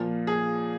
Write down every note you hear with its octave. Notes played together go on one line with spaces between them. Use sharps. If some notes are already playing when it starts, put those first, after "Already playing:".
Already playing: A#2 F3
G#4